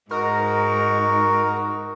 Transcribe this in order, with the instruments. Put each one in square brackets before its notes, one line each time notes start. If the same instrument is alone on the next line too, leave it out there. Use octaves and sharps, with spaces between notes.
[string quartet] G#2 [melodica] D#4 F#4 [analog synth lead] A#4